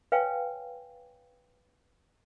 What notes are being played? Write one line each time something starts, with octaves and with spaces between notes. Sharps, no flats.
B4 C#5 F5 G5 G#5